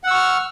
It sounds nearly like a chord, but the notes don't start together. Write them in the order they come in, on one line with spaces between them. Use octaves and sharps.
F#5 E6 C#6 F6